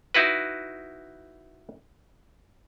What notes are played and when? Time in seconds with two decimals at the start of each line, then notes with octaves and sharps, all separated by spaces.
0.14 D#4 E4 F#4 B4